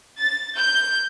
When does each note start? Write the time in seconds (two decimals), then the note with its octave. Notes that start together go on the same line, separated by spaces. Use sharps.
0.18 A6
0.55 G6